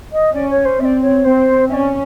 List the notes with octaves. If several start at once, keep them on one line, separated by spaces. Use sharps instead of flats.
D#5
C#4 D5
C#5
C5
C4 D5 E5
C#5
C4 C5
C#4 D5 E5